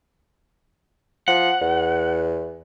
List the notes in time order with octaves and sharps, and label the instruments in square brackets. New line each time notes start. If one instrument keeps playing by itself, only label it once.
[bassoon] F3 [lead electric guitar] F#5
[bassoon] E2